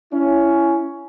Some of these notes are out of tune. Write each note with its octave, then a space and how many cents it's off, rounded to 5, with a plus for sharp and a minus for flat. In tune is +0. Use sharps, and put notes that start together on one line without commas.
C#4 +10 E4 +20